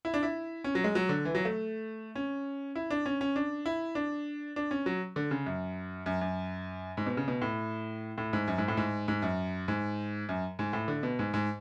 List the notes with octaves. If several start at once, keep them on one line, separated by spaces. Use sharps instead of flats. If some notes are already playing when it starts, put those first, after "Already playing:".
E4
D4
E4
C#4
F#3
G#3
F#3
D3
E3
F#3
A3
C#4
E4
D4
C#4
C#4
D4
E4
D4
D4
C#4
F#3
D3
C#3
F#2
F#2
F#2
G#2
B2
C#3
B2
A2
A2
G#2
F#2
G#2
A2
G#2
G#2
F#2
G#2
F#2
G#2
A2
D3
B2
G#2
G#2